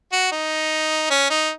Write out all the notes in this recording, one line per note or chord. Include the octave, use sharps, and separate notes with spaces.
F#4
D#4
C#4
D#4